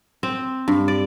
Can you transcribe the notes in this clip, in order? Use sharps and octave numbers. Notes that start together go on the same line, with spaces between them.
C4
G2
D5